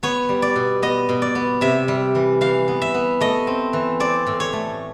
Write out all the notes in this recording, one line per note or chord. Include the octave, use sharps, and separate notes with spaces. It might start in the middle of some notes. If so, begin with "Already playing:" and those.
B3 C#5
G3
D5
B2
B3 D#5
B2
D5
B3
C3 E5
G3
E3
E3 F5
B3
E5
B3
A3 D#5
C4
E3
C4 D5
A2
C#5
A3